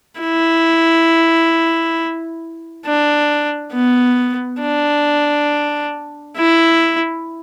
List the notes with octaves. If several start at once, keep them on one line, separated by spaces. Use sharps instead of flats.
E4
D4
B3
D4
E4